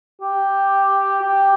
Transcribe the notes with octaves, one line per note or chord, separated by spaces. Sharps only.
G4
G4